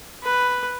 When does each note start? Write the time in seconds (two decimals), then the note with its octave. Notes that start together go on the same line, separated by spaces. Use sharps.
0.23 B4